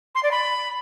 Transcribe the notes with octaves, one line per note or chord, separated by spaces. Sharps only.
C6
D5
B5